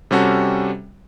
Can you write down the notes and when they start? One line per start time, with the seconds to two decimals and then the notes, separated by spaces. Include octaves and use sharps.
0.11 C3 G3 C#4 F#4 A4